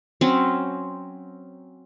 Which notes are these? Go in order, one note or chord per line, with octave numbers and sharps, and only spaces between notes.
F#3 C4 C#4